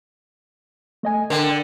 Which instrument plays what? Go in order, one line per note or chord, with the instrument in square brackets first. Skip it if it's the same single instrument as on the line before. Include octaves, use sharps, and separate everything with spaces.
[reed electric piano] A3 D#5 G#5
[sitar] D3 [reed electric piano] A#4 G5